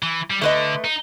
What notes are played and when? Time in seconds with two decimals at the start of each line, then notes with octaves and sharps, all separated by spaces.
0.03 E3
0.30 G3
0.41 D3 A3 B4 D#5
0.84 D#4